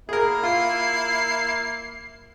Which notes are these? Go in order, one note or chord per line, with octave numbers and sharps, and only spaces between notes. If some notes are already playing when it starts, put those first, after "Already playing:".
A#3 E4 G#4 A#4
F4 C7